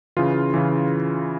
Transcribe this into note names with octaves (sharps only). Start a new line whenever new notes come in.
C#3 E3 F4
C#3 E3